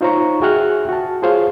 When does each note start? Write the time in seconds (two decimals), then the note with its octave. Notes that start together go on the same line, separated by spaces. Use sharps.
0.01 D#4 F4 C5 C#5 A#5 C#6
0.42 F#4 G#4 E5 G5 F6 F#6
0.89 F#4 A5
1.22 F4 G#4 C5 C#5 F5